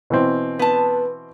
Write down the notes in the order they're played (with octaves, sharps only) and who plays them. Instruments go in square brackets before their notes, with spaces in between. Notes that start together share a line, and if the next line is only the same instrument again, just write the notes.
[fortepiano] B2 E3 C4
[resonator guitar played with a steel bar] B3 A5 [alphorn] B4